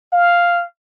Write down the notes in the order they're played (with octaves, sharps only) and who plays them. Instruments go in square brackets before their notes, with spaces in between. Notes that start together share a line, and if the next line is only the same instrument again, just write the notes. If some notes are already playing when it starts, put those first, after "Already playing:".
[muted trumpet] F5